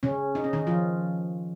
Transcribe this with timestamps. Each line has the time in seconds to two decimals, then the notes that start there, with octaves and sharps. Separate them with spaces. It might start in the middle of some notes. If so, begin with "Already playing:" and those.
0.03 C#3 C#4
0.35 D#4
0.44 C#4
0.53 D#3 D#4
0.67 F3 F4